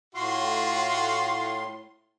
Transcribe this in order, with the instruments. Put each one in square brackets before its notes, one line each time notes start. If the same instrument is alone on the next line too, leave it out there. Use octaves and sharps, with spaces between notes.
[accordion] A2 C6 [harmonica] F4 F#4